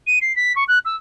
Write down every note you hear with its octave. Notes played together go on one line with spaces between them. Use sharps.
D#7
C7
B6
C#6
F#6
E6